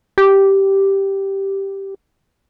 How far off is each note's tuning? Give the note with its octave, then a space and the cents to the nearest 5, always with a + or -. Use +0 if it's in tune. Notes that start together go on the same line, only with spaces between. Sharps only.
G4 -5